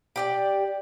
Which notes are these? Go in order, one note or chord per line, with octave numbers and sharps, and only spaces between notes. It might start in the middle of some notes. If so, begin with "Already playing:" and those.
G4 D5 G5